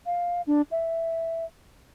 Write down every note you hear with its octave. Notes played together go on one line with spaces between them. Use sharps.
F5
D4
E5